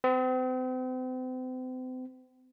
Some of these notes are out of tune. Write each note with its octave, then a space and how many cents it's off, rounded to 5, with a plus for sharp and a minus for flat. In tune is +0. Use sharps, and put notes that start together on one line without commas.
C4 -40